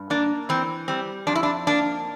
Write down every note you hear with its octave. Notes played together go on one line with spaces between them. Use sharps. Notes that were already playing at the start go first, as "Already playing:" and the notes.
Already playing: G2
A#3 D4
E3 C4
G3 C4
F2 D4
E4
D4
A#3 D4